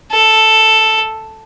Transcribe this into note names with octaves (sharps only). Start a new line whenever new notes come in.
A4